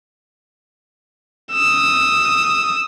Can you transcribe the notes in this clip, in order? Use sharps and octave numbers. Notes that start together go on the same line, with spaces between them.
D#6 E6